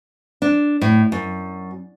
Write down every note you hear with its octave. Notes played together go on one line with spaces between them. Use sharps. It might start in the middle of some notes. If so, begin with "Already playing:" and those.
D4
A2
F#2